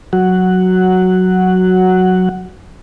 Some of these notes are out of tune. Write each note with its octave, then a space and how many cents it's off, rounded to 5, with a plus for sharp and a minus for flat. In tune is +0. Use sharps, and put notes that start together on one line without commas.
F#3 -5 F#4 +0 F#5 +5